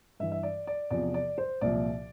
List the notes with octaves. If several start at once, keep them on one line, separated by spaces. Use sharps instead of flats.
G2 E3 E5
E5
D5
D5
E2 C3 F3 D5
D5
C5
C2 A#2 F3 D5